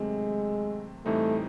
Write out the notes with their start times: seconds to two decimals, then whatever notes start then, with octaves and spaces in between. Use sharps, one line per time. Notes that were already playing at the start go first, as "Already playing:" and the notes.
Already playing: C3 D#3 F#3 G#3 A3 C4
1.05 A2 E3 G3 A3 C4 D#4